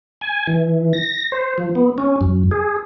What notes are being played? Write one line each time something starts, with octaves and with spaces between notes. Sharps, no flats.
G#5
E3
A#6
C5
F3
B3
C#4
F#2
G#4